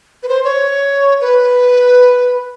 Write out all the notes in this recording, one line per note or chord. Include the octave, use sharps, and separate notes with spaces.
B4
C5
C#5
B4